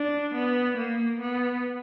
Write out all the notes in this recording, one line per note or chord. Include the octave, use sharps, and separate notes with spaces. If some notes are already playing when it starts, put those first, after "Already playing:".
Already playing: D4
B3
A#3
B3